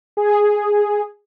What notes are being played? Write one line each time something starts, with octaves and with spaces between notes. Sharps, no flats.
G#4